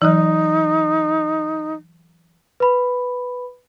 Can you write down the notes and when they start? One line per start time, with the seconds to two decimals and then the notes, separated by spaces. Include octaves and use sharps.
0.02 E3 F#3 D#4
2.60 B4 B5